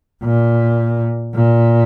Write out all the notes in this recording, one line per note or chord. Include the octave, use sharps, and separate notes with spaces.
A#2
A#2